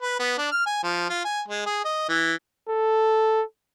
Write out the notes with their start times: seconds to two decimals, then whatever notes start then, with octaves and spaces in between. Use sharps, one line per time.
0.02 B4
0.20 B3
0.38 D4
0.52 F6
0.66 G#5
0.84 F3
1.10 F4
1.25 G#5
1.48 G#3
1.66 G#4
1.85 D#5
2.09 E3
2.69 A4